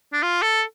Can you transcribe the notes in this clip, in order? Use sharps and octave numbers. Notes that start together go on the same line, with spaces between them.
D4
F4
A4